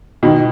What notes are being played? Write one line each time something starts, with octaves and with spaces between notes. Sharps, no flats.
B2 D#3